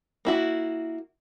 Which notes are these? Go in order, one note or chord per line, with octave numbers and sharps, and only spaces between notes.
A#3 E4 F#4